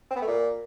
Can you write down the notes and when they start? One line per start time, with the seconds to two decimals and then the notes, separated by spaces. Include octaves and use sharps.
0.10 C4
0.16 B3
0.22 A3
0.27 A#2